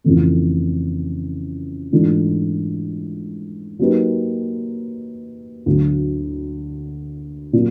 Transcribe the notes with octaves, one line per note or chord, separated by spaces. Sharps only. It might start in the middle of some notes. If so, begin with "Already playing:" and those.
F2 C#3 E3 A3
G#2 E3 A3 D4 F4
F#3 A#3 D#4 G4 B4
D2 D3 F#3
A#2 F#3